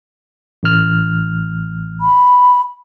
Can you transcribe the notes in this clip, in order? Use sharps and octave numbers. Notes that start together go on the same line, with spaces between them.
A1 F6
B5